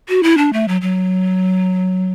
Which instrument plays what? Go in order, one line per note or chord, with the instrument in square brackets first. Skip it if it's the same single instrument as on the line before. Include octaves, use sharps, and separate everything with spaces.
[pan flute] F#4
E4
D4
A3
F#3
F#3